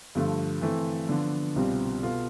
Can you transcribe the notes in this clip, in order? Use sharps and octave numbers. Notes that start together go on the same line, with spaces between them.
G2 D3 F3 A3
E3 A3 C4
D3 F3 B3 D4
C2 B2 G3 C4 F4
B2 B3 F4 A4